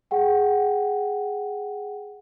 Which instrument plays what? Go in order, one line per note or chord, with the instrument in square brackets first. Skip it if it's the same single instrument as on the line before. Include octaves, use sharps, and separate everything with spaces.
[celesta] G#4 F#5 G5